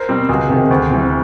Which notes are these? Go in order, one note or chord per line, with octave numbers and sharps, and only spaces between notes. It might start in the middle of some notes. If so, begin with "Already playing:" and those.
Already playing: A#4 C5
B2 G3 C4
C#2 F#4 G#4
C3 D#3
D2
C3 E3 G3